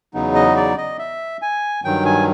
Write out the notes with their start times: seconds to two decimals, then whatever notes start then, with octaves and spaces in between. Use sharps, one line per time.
0.14 E2 C#3 F#3 B3 D#4
0.35 D#5
0.56 D5
0.78 D#5
0.99 E5
1.42 G#5
1.84 G2 D#3 F#3 G5
2.05 G#5